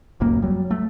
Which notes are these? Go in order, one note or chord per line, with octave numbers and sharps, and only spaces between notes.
D1 C#2 F#2 A#3
F#3 G3
A3